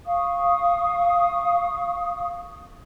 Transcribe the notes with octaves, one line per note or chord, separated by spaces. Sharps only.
F5 C#6 D#6